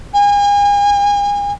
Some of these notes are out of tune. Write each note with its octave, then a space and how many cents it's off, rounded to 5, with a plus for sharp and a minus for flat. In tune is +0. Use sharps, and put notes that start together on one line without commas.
G#5 -40